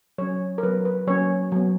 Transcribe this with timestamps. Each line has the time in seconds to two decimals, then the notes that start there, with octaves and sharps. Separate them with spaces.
0.18 F#3 C#4 C#5
0.58 A#4
0.63 F#3 B3 B4
0.85 B4
1.07 F#3 A#3 C#4 C#5
1.52 F#3 B3